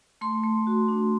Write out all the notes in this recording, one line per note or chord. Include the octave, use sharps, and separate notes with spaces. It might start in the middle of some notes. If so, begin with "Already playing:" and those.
A3 C6
A3
F#4
D4